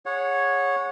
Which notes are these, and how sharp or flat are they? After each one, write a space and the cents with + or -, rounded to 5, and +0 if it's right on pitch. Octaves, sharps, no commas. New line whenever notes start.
G#4 -20 C#5 +0 F#5 -25